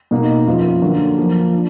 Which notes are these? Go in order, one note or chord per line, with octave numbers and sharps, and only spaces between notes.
B2 A#3 D#4
F#2 F3 B3 F4
D3 F#3 A#3 F4
F3 A#3 F4
D4